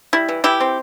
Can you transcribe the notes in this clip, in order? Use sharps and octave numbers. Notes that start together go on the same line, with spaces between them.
G3 E4
E3
E3 E4 G4
C4